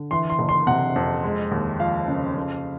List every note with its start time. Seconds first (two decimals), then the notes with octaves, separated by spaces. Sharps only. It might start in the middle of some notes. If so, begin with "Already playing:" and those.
Already playing: D3
0.11 E3 C6
0.30 C6
0.39 F#1
0.49 C6
0.67 C3 F#5
0.96 F2
1.24 G#3
1.52 D#2
1.80 F3 F5
2.08 C#3
2.37 F2